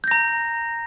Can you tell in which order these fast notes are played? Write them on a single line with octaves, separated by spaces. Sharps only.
G6 A#6 A#5